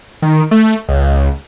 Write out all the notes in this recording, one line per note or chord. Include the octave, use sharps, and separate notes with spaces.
D#3
A3
C#2